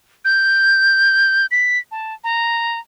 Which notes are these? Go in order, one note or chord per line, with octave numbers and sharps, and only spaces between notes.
G6
B6
A5
A#5